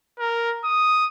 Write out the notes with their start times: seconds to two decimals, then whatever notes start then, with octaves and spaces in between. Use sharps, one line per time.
0.19 A#4
0.64 D#6